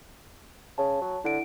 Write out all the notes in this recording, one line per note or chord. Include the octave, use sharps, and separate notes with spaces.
C#3 C#5 A5
F#3
D3 E4 F#5 D7